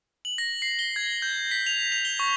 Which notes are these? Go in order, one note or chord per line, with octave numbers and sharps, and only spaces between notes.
F#7
A#6
C7
G7
G#6
G6
B6
F7
F7
G7
C#6